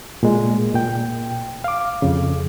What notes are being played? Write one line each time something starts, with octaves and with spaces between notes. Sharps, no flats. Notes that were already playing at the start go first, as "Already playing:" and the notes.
A#2 G#3
A#2 G5
F5 D6
F2 C#3